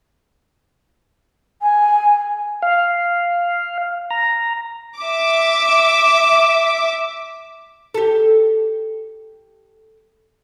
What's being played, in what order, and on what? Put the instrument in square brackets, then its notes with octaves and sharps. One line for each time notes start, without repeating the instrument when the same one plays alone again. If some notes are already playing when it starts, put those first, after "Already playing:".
[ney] G#5
[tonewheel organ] F5
A#5
[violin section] E5 D6
[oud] G4 A4